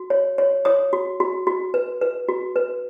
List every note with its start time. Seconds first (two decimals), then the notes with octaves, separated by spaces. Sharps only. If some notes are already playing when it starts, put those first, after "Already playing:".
Already playing: F#4
0.10 C#5
0.38 C#5
0.65 C#5 D#6
0.93 F#4
1.20 F#4
1.47 F#4
1.74 B4
2.02 B4
2.29 F#4
2.56 B4